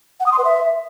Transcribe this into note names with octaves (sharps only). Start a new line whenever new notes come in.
F#5
D#6
C6
B4
E5